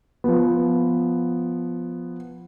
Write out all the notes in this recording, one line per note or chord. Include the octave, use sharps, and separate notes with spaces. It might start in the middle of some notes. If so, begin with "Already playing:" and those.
F3 B3